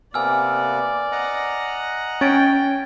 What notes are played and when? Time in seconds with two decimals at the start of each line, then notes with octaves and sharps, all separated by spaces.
0.14 C3 A#3 B3 D5 G#5 E6 F6
1.12 D#5 F#5 A#5
2.21 C#4 G5 G#6 A6 D7